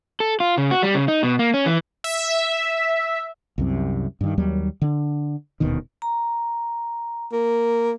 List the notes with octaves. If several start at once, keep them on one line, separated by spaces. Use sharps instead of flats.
A4
F4
C#3
F#4
G3
C#3
D#4
B2
A#3
C#4
E3
E5
C2 F#2 C3
G2 D#3
D#2 F#3 G3
D3 D4
D#1 D2 B2 D#3
A#5
A#3